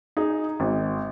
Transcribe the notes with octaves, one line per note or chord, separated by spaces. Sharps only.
D#4 G#4
G#1